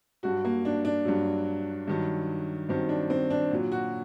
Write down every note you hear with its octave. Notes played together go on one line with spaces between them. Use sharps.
G2 F#3 F#4
A#3
D4
D4
G2 F#3
G2 D#3 F#3
G2 D#3 F#3 C4
D4
C4
D4
A#2 F#3
F#4